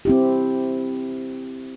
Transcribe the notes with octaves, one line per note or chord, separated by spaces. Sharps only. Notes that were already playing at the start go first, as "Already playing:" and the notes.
C4 E4 G4